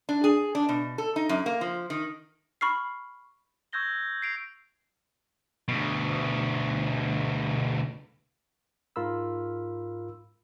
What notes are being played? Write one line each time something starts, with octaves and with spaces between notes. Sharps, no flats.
D4
G#4
D4
B2
A4
D#4
F#2
A#3
F3
D#3
B5 C#6 F6 C7
C#6 E6 G6 G#6 A#6 G7
C7 D7 F7
D2 B2
G#2 F4 A#4 B5 E6